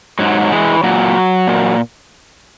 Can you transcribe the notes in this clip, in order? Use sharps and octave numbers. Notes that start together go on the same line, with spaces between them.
G#2 F#3
F#3
E3 G#3
A#2 F#3
A#2